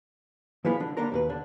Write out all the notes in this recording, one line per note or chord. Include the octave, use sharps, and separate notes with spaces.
E3 F3 G#3 B3 E4 F4
D3 D4
D3 G3 A#3 D4 A#4 A#5
D#2 B2 B4
D3 D4